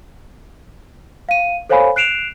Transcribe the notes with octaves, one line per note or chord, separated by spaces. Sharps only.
F5 D#7
A4 C5 C#5 F5 G#5 B5
F#6 C7 D7 E7 F7